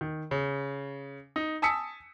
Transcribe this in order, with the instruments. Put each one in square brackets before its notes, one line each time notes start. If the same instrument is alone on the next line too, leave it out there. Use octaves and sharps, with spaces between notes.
[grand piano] D#3
C#3
D#4
G#5 A5 D#6 E6 B6 C#7